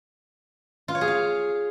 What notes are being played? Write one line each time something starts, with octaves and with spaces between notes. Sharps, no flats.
F4
C#5
G#4
F5